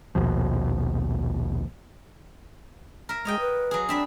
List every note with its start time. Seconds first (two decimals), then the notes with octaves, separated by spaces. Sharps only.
0.15 A#1 D#2 B2 F3
3.09 A#4 E5
3.25 G#3 C#5 D#5 G5
3.40 B4
3.71 F#3 G#4
3.89 C4 D4 E5 B5